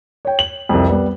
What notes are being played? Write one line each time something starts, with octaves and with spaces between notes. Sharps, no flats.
C#5 G5
F#7
C2 F2
G3 B3